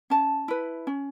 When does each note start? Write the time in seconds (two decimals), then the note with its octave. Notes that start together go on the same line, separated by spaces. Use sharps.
0.10 C#4 A5
0.48 E4 B4
0.87 C#4